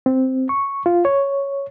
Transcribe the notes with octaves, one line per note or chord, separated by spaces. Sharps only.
C4
C#6
F4
C#5